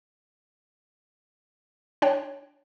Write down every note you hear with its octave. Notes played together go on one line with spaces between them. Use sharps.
D4 C#5 G5